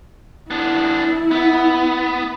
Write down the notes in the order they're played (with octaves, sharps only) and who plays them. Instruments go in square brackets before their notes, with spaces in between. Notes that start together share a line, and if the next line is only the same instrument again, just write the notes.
[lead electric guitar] B3 D4 [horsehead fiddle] E4
[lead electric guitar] B3